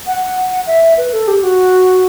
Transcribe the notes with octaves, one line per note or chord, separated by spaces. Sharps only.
F#5
E5
B4
A4
G4
F#4